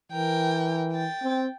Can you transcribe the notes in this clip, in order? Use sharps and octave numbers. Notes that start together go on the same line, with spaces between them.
E3 A#4 G5
G5 A6
C4